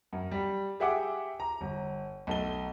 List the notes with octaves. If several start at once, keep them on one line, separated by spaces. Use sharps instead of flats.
F#2
G3
G4 G#4 E5 F#5 G5 D6
A#5
G1
B1 A3 G7